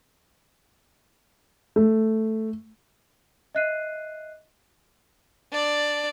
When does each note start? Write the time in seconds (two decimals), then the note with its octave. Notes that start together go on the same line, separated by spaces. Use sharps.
1.76 A3
3.55 D#5 E5 F#6 C7 D#7
5.52 D4 D5